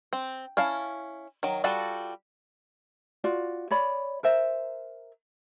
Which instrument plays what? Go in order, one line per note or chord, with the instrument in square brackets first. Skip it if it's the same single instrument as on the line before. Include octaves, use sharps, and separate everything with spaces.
[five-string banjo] C4
C#4 E4 F5 A5
D#3 F#3
G3 F4 F#4 A4 A5
[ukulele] F4 F#4 D5
C#5 D5 B5
A#4 C5 E5